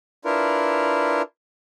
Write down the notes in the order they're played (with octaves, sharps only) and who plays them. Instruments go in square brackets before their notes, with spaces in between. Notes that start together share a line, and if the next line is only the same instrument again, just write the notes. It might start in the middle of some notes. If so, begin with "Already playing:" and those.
[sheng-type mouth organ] D4 E4 F4 A#4 B4